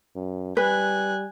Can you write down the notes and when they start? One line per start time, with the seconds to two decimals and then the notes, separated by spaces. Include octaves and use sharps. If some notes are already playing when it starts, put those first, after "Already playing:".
0.16 F#2
0.57 G3 B4 G#5 F#6